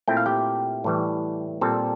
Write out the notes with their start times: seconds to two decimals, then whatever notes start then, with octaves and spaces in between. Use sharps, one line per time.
0.08 A#2 A3 C4 E4 G5
0.17 F5
0.26 G4 G5
0.84 A2 E3 G3
1.61 A#2 G3 C4 A4 A5